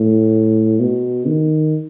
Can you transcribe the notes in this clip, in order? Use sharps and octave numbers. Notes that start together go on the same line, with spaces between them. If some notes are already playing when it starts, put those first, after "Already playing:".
Already playing: A2
B2
D#3